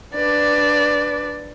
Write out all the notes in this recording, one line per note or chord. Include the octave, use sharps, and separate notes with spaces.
D4 B4 D5